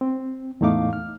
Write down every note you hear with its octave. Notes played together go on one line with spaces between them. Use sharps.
C4
E2 A2 A3 D#4 F5 D6
F6